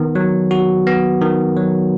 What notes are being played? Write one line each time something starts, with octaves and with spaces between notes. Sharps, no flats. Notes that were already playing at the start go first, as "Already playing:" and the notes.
Already playing: D#3 B3
F#3
F#4
B3
D#3
F#3